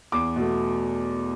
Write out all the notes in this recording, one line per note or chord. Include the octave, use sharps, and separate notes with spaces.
E2 D6
B2 A3